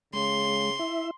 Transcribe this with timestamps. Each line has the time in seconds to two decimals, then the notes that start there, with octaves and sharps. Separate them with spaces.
0.13 C#3 G#3 C6
0.79 E4 E5